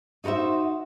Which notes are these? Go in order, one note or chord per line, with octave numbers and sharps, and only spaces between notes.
D#4 F#4 A#4 C5 E5